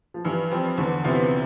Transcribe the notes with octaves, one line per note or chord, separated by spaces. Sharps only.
F3
G2 E3
F3 C4
E2 D3
C3 E3 B3 F4